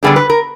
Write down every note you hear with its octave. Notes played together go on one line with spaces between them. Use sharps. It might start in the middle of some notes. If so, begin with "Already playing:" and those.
D3 G3 B3 D4 G#4
B4
A#4